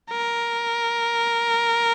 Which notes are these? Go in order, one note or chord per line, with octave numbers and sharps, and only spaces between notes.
A#4